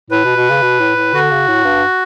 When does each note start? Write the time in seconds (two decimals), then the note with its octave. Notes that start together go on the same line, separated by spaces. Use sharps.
0.11 A2 B4
0.24 B2
0.36 B2
0.50 C#3
0.62 B2
0.80 A2
0.96 A2
1.13 D3 F#4
1.31 C#3
1.48 A2
1.64 G2